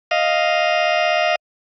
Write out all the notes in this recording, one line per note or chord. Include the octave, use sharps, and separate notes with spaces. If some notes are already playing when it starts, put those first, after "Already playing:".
D#5 F5